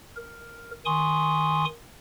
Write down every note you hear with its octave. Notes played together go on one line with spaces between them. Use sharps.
A#4
D#3 G#5 C6 C#6 D#6